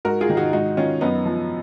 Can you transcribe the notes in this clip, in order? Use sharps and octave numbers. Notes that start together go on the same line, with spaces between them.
G#2 F#4 A#4
F4 G#4
D#3
D#4 F#4
G#2 D#4 F#4
D#3 C#4 F4
F#2 B3 D#4
F3